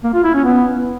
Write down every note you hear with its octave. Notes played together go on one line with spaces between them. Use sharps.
A#3
F4
E4
C#4
B3